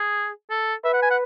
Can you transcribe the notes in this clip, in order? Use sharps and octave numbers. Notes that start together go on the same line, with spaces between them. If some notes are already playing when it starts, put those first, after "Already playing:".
Already playing: G#4
A4
B4 E5
F#5
G#5
F#5